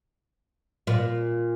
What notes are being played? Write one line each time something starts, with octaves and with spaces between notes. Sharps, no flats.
A#2